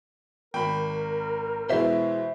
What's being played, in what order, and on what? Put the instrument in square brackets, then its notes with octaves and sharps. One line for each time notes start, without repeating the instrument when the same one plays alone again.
[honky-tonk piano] G#1 [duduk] A#4 [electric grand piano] G5 B5
[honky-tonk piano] B2 E3 G#3 [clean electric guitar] C5 E5